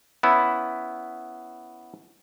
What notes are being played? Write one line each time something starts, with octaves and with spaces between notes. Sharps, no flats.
B3 C#4 E4